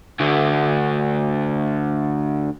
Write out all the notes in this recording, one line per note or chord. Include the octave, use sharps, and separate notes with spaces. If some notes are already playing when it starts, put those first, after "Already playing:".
D2 D3